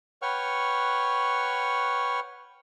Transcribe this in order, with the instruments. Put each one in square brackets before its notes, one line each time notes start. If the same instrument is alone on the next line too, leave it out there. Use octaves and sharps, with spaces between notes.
[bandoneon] B4 C#5 F#5 G5 C#6 F6